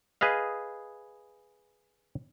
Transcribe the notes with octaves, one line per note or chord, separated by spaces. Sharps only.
G#4 B4 D#5 F5